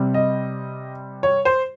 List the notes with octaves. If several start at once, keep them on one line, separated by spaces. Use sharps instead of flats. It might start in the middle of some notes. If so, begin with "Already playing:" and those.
Already playing: C3 G3 C4
D#5
C#5
C5